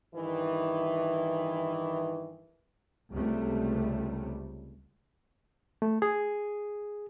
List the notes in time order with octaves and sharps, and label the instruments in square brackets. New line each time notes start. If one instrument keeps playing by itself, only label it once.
[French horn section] G2 D#3 E3
[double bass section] C#2 C3 G3 A3
[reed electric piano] A3
G#4